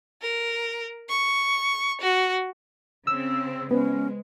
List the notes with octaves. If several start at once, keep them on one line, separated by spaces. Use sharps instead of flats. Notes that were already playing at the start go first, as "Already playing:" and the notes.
A#4
C#6
F#4
C#3 C4 E6
G#3 B3 C#4 B4 C5